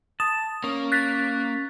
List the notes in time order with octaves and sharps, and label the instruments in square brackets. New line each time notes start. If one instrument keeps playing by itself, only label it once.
[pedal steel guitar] A5 [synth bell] D#6
[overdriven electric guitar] A#3 [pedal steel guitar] C#4
[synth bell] F#6 A6 B6